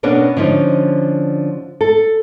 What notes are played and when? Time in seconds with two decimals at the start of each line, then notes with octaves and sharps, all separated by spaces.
0.03 B2 A#3 B3 C#4 D4
0.37 D3 F3 C#4 D#4
1.81 A4